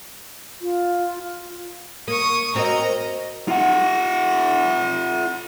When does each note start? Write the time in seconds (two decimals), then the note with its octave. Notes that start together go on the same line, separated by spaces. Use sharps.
0.62 F4
2.08 A#3 C#6 D#6
2.55 A#3 C4 F#4 D#5 A#5
3.48 F4 F#5